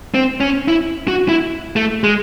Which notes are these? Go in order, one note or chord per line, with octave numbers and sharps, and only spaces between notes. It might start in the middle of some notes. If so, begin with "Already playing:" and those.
C4
C#4
E4
F#4
E4
A3
G#3